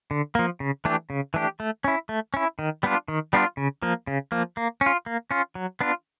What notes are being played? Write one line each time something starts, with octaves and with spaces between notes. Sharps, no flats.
D3
F3 A#3
C#3
E3 A3 D4 G4
C#3
E3 A3 D4 G4
A3
C#4 E4
A3
C#4 E4
D#3
G3 B3 D4 F4
D#3
G3 B3 D4 F4
C#3
F3 A#3
C#3
F3 A#3
A#3
C#4
F4
A#3
C#4 F4
F#3
B3 D4 F4